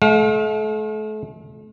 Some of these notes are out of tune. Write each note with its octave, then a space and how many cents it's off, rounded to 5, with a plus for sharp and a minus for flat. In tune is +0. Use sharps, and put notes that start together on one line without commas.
A3 -40 F5 +40